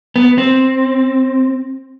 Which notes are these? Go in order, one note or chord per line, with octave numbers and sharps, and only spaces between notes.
B3
C4